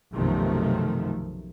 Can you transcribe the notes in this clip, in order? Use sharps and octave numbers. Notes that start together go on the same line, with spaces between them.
B1 F#2 C3 D#3 F3 A3